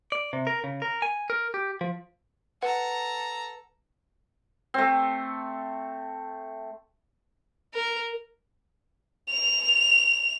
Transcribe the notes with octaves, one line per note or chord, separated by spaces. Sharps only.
D5
C3
A#4
C#3
A#4
G#5
A#4
G4
F3
A4 B4 F#5 A#5
A3 C4
A#4
F7